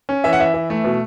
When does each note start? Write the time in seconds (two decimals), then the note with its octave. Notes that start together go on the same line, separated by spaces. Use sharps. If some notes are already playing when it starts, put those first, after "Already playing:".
0.09 C#4
0.24 E3 E5
0.33 F#5
0.40 E3 E5
0.54 E3
0.70 A3
0.84 B2